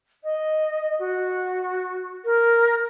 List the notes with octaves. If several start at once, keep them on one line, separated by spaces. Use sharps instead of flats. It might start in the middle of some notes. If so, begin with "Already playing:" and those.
D#5
F#4
A#4